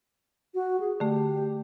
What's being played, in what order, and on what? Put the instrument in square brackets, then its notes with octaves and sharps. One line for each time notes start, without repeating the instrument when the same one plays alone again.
[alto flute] F#4
G#4
[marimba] D3 A3 [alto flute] G4